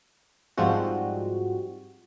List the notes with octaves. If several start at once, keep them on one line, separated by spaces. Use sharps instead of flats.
G#2 F3 G3 G#3 C4 F#4